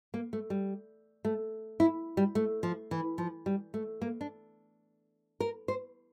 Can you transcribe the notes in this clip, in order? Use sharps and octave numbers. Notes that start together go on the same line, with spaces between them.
A#3
A3
G3
A3
E4
G3
A3
F3
E3
F3
G3
A3
A#3
D4
A#4
C5